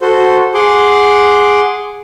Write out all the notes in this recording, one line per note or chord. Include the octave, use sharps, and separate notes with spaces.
F#4 A4 C5
G#4 F#5 C6 D6